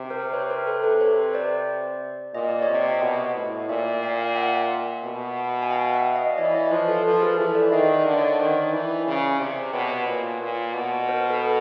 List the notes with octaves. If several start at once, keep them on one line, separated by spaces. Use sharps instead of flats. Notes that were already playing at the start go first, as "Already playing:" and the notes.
Already playing: C3
A#4 C5
B4 C#5
A#4 C5
A4 B4
A4 B4
B4 C#5
C5 D5
A#2 D#5
D5
C#5 D#5
C3
B2
A2
A#2 D5 E5
F5 G5
G5
E5 F#5
B2
G#5
F5 G5
E5 F#5
D#5 F5
D5
E3 C#5 D#5
C#5 D#5
F3 B4 C#5
A4 B4
F3
B4
G#4 A#4
E3 A4 B4
D5 E5
D#3 D#5 F5
D5 E5
D3
C#5 D#5
C#5
D#3 C5 D5
E3
C#3
C3
B2 B4 C#5
A#2
A#2
B2
A#4 C5
A4 B4